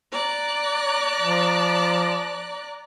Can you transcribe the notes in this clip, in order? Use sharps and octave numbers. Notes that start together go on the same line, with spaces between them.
D5 A#5 F#6
F3